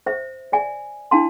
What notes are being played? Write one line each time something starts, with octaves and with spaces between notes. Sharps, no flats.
C5 E5
D5 E5 G#5
D4 E4 F5 A5 C6